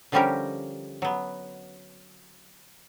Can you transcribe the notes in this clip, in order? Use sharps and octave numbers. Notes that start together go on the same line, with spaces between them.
D3 F3 G3 C#4 G4 A#4
F#3 B3